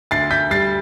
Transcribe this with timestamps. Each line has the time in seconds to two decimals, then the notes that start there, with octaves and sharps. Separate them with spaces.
0.11 D2 A6 C7
0.31 D2 G6 B6
0.50 G3 A6 C7